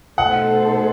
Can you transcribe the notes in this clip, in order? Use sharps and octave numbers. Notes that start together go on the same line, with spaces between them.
B2 A3 D#4 A4 C5 F#5